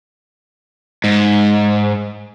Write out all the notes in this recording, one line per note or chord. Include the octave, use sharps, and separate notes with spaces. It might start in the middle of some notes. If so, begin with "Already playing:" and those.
G#2